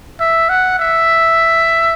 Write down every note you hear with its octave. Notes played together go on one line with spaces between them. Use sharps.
E5
F#5
E5